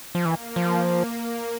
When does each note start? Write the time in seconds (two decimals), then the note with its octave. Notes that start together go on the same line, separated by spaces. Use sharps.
0.15 F3
0.25 E3 A#3
0.56 F3